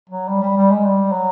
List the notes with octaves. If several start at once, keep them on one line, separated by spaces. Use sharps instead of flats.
F#3
G3
G3
G3
G#3
G3
F#3